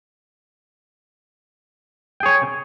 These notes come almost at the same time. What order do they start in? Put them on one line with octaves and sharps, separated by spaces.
G5 G#4 C#5 G#5